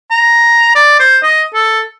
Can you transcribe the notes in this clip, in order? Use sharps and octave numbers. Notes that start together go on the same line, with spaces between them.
A#5
D5
C5
D#5
A4